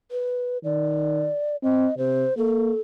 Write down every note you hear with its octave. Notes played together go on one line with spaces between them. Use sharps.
B4
D#3 D5
C4 D#5
C3 C5
A#3 A4